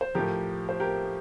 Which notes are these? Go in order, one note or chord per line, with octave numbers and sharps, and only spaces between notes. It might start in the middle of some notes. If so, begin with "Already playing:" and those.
C5
A2 F3 G4 A#4
C5
G4 A#4